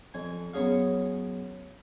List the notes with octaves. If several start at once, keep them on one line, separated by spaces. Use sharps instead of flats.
F2 G#5
F#2 B3 C#4 G#4 F5